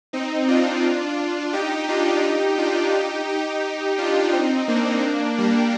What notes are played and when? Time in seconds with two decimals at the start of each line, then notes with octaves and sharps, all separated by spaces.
0.13 C4 D#4
0.48 D4 F4
1.53 D#4 G4
1.88 D4 F4
2.23 D#4 G4
2.58 D4 F4
2.93 D#4 G4
3.29 D#4 G4
3.98 D4 F4
4.33 C4 D#4
4.68 A#3 D4
5.38 G3 A#3